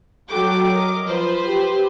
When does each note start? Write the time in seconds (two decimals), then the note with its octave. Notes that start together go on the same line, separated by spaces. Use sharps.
0.29 F#3 F#4 A4 G5 D6
0.74 A#4 D#5
1.06 F3 B4 C5
1.44 G4